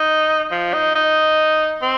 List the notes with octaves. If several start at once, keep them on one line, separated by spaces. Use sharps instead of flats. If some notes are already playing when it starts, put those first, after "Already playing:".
Already playing: D#4
F3
D#4
D#4
C4